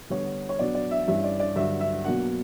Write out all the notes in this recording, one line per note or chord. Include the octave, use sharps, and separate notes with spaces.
D3 G3 B3 D4 C#5
C#5
B2 F#3 B3 D4 D5
D5
E5
G2 E3 G3 C#4 E5
D5
D5
G2 D3 F#3 E5
E5
B2 F#3 A#3 D4 F#5